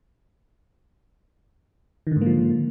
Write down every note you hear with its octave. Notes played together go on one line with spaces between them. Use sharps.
G#2 D3 D#3 F3 A#3